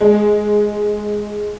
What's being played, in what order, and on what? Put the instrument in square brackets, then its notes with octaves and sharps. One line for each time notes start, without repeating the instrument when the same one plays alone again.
[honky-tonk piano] G#3